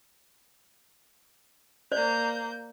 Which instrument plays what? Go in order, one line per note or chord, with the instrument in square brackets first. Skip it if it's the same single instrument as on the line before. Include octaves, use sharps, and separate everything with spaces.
[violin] A#3 G6 [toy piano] C5 D5